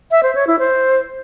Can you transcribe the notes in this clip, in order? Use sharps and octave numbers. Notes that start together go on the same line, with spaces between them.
E5
C5
C#5
E4
C5